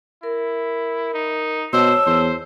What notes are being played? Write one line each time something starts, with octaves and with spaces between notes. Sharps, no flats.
E4 A#4
D#4
B2 C5 C#5 A5 E6
E2 C5